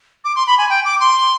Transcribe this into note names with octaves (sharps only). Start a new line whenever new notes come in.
D6
C6
B5
G#5
G5
D6
C6